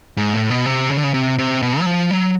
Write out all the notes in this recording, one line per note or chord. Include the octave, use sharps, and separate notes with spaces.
G#2
A2
B2
C3
C#3
D3
C#3
C3
C3
B2
F#3
F3
F#3